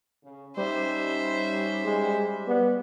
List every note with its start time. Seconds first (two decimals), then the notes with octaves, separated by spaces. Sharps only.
0.23 C#3
0.57 G3 C#4 D#4 C5 E5
1.84 G#3
2.48 B3 D5